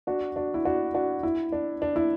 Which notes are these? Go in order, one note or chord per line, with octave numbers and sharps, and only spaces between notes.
D4 F#4
D4 F#4
E4
D4 F#4
D4 F#4
E4
D4
D4
E4